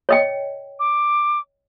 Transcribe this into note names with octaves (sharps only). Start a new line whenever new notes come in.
C#5 D#5 G5
D6